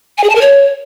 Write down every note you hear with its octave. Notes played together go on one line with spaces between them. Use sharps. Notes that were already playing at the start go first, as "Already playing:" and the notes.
G#5
G#4
A5
A#4
C#5